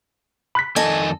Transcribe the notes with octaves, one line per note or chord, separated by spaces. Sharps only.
B5 F#6 B6
F2 D#3 A4 D#5 G#5